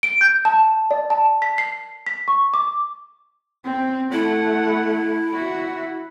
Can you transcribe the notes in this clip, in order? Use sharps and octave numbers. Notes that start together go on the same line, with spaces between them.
D7
G6
A5
D5
A5
B6
C7
B6
C#6
D6
C4
A3 E4 F#5
F#4 E5